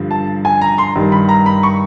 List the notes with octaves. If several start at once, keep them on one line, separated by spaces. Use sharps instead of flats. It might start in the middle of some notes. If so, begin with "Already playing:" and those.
Already playing: G2 D3 F3
A5
G#5
A#5
C6
G2 D#3
B5
A#5
B5
C#6